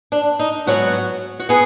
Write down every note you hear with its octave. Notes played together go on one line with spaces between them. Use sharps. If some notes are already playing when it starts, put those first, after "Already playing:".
D4
D#4
G#2 F#3 B3 F#4
F#4
B3 G#4